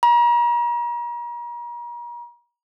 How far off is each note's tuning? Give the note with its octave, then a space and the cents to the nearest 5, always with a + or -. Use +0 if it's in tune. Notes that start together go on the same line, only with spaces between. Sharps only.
A#5 +40